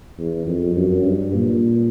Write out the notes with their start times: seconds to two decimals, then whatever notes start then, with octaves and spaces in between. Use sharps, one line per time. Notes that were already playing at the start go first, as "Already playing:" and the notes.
0.19 E2
0.47 F2
0.76 F#2
1.05 G2
1.34 A#2